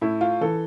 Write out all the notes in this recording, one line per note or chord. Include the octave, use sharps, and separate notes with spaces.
A2 E4
F4
E3 A4